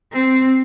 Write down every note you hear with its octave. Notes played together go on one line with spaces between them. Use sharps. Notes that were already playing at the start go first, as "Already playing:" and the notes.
C4